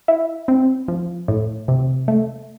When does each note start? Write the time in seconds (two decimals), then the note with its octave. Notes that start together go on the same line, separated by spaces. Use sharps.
0.08 E4
0.48 C4
0.88 F3
1.28 A2
1.68 C3
2.08 A3